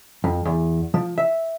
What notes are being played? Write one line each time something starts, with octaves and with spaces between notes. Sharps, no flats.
F2
E2
F3
E5